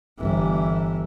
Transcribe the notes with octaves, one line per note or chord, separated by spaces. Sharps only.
G1 E3